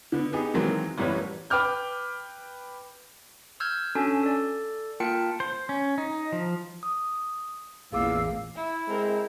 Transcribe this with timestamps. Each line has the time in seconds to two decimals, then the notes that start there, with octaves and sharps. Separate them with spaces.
0.12 D3 B3
0.33 B3 D#4 G4 G#4
0.54 D#3 E3 F#3 G#3 A#3 C4
0.98 A1 F#2 G3 B4 C#5
1.50 B4 G5 D6 F6 G6
3.60 E6 F6 G6 G#6
3.95 C#4 D4 F#4 A4 G#5 A5
4.23 A4 D5
5.00 A#3 F4 A#4 G5 A5 C#7
5.40 C5
5.69 C#4
5.98 D#4
6.32 F3
6.83 D#6
7.93 A1 E2 A#2 G#4 F5 D6 E6
8.55 E4
8.88 G#3 C4 A#4